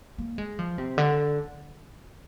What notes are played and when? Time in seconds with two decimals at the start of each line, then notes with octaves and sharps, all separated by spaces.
0.18 A#3
0.38 G#3
0.59 F3
0.78 C3
0.98 D3